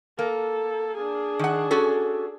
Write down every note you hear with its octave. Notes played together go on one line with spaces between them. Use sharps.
A#3 A4
D4 G#4
D#3 F#5
C#4 F#4 A4